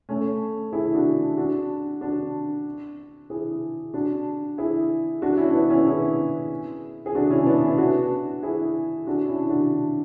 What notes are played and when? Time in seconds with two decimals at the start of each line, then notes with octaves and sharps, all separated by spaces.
0.09 A3 C#4
0.73 E4 G#4
0.95 D4 F#4
1.37 D4 F#4
2.01 D4 F#4
3.30 E4 G#4
3.94 D4 F#4
4.58 E4 G#4
5.22 D4 F#4
5.37 C#4 E4
5.54 B3 D4
5.70 C#4 E4
5.86 E4 G#4
7.06 G#4
7.15 D4 F#4
7.30 C#4 E4
7.46 B3 D4
7.62 C#4 E4
7.78 D4 F#4
8.43 E4 G#4
9.07 D4 F#4
9.27 C#4 E4
9.50 D4 F#4